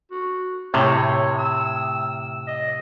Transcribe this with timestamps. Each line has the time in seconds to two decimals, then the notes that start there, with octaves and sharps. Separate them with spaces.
0.11 F#4
0.74 A2 C3 C#5
1.39 E6
2.48 D#5